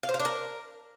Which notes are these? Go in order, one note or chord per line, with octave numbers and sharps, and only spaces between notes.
F5
C5
F5
D4
A#4